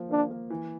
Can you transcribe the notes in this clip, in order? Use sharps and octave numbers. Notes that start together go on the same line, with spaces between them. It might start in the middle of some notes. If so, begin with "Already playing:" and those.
Already playing: F3 A#3
A#3 D4
A#3
E3